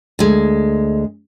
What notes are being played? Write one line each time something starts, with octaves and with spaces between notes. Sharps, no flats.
D2 G#3